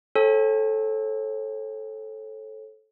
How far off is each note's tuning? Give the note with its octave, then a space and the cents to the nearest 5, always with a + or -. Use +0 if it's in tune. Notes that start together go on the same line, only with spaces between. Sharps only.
A4 -10 C#5 -40 G5 +40